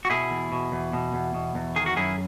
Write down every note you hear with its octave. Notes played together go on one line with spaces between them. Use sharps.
F#4
B2 E4 G#4
E2
B2
E2
B2
E2
B2
E2
D#3 G#4
F#4
F#2 E4 G#4